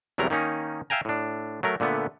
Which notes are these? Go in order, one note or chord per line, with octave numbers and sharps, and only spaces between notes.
E2 C3 F#3 G3 A#4 A#5
D#3 A#3 C#4 D#4
E5 F5 G5 G#5 A#5
A2 D4
F#3 A3 A#4
A#2 D3 A3 B3